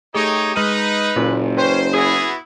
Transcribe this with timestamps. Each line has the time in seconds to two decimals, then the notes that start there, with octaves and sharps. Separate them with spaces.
0.14 A3 D#4 G4 G#4 C#5
0.56 G#3 D#4 B4 F6 D#7
1.16 F#1 A#2
1.57 C#4 B4 C5 G5 C6
1.94 B3 E4 F#4 G#4 D#6